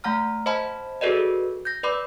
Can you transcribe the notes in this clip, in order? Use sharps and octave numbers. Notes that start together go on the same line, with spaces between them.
A3 F#5 A#5 F6
C5 D#5 F#5 A5 B5
F#4 G#4 A4 B4 D5 D#5
G6 A#6
B4 D5 B5 D6